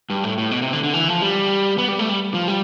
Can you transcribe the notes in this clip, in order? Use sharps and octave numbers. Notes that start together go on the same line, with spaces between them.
G2
A2
A2
B2
C3
D3
D3
E3
F3
G3
B3
G3
A3
G3
F3
G3